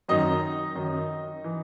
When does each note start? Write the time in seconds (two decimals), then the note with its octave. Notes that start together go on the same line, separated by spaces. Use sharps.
0.08 F#2 D#3 F#3 D#4 D#5
0.75 F#2 D#3 F#3
1.44 E3